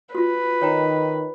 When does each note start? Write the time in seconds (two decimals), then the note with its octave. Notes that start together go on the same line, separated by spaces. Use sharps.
0.15 F4 F#4 B4
0.62 D#3 D#4 C#5 G5 A#5